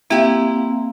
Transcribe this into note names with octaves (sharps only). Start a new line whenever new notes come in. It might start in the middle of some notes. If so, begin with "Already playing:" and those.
A#3 C4 E4 G4 F5